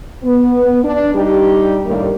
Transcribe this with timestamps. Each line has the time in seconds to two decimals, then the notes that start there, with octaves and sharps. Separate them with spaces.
0.24 B3
0.84 D4
1.15 G3 D4 D#4 G4
1.86 D#2 A2 G3 A#3 A#4